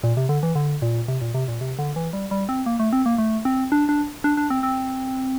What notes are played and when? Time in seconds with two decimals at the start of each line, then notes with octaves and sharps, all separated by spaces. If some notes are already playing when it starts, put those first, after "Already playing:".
0.04 A#2
0.17 C3
0.29 D3
0.43 E3
0.55 D3
0.82 A#2
1.08 C3
1.22 A#2
1.34 C3
1.48 A#2
1.61 C3
1.79 D3
1.96 E3
2.13 G3
2.31 G3
2.49 C4
2.66 A#3
2.79 A3
2.93 C4
3.06 A#3
3.18 A3
3.45 C4
3.72 D4
3.89 D4
4.24 D4
4.37 D4
4.50 C4
4.63 C4